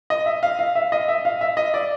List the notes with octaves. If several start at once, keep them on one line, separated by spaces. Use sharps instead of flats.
D#5
E5
F5
F5
E5
D#5
E5
F5
E5
D#5
D5